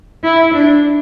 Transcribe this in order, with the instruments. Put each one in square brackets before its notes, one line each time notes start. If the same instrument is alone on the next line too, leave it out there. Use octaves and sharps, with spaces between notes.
[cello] E4
D4